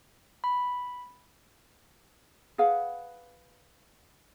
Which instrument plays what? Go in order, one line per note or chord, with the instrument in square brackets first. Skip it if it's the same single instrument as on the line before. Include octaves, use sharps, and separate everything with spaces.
[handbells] B5
[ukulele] G#4 B4 F5 F#5